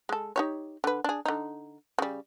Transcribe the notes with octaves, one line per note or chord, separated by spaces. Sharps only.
G#3 A4
D#4 G4 C#5
D3 B4
D4 G#4
D3 D#4
C#3 G3